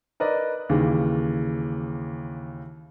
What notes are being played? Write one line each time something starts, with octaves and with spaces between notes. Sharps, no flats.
A#4 B4 D5 D#5
D#2 C#3 E3